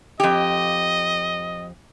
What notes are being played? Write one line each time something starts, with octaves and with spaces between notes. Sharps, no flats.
F2 G4 D#5